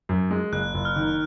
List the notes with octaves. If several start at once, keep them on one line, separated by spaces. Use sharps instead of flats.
F#2
G#3
F#1 F#6
F#1
F6
D#3